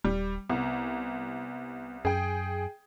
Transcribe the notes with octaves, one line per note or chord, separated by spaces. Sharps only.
D#1 G3
C2 B3
F#2 G#4 G5